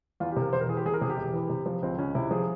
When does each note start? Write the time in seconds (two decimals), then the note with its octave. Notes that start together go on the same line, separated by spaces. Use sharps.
0.20 E2 F4
0.31 G4
0.36 C3
0.42 A#4
0.53 E1 C5
0.61 A#4
0.69 E3 G#4
0.77 G4
0.85 E2 G#4
0.94 A#4
1.01 C3 G#4
1.10 G4
1.17 E1
1.33 E3
1.50 C3
1.66 F3
1.82 C#2 C4
1.98 C#2 C#4
2.15 C3 E4
2.31 F3 G#4